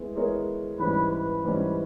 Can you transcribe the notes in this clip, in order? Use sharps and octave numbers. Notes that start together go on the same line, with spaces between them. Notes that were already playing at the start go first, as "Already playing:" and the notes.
Already playing: G#3 B3 E4
G#3 B3 E4 A#4 C#5
G#2 E3 G3 C#4 B4
B4
G#2 E3 G3 C#4